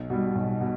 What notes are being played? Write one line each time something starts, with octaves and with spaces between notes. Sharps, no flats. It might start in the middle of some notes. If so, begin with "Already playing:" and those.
Already playing: B1
B2 G3
B1
B2